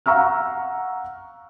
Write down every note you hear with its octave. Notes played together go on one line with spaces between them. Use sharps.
F5 F#5 A#5 C#6 E6 F6